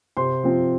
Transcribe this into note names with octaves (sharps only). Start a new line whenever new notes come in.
C3 C5 C6
F3 C4